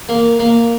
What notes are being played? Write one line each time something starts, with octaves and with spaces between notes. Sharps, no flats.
A#3
A#3